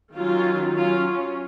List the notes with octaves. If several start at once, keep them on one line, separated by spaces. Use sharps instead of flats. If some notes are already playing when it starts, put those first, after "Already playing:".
D#3 F#3 C#4 F4
F#3 C#4 F4